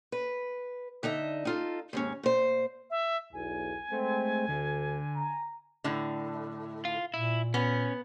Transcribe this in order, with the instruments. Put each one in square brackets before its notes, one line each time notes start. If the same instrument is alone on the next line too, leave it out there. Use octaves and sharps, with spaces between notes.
[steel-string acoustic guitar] B4
D3 D#4 D#5 E5
D#4 F4 A4
D#2 G#2 C#4
A#2 C5
[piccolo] E5
[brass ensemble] B1 E2 [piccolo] G#5
[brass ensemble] G#3 C4 [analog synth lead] A3
[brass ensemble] D2 [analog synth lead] D3
[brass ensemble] A#5
[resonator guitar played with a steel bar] A2 D3
[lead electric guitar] F4
[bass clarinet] A#2 [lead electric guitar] E4
[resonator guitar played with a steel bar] B3 [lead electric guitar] C#4